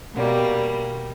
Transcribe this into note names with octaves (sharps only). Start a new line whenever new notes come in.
B2 G3 A#3